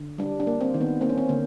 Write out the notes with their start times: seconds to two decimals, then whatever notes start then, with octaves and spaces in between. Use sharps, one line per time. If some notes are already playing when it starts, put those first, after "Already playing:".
Already playing: D3
0.18 G3 D4
0.40 D4
0.47 A#3
0.61 C4
0.74 D#3
0.81 B3
1.01 A#3 C4
1.09 C#4
1.18 C4
1.29 D3 A#3